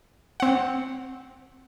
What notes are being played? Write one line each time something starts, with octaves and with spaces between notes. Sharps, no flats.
C4 F#5